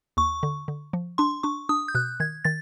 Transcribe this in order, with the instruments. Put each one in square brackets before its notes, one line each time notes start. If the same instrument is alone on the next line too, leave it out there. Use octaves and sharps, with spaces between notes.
[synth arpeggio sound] D#2 [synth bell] C#6
[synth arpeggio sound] D3
D3
F3
[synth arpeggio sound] D4 [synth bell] C6
[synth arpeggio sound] D4 [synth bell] C#6
[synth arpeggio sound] D4 [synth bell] D#6
[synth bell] G6
[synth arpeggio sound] B2 [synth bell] F#6
[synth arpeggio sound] D#3 [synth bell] G#6
[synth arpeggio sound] D#3 [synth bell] A6